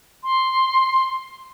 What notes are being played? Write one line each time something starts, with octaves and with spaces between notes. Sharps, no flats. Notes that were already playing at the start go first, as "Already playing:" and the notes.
C6